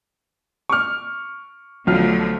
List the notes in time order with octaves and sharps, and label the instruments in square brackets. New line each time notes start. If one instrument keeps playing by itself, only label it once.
[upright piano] C#6 D6 F6
[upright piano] B1 F4 F6 [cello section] D3 F3 A3